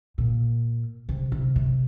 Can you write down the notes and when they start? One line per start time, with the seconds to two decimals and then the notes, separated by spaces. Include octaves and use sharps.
0.18 A#2
1.09 C3
1.32 C3
1.56 C3